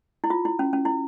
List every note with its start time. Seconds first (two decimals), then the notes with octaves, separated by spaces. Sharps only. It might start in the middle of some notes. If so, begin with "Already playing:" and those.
0.24 E4
0.30 F4
0.45 E4
0.59 C#4
0.73 C#4
0.85 E4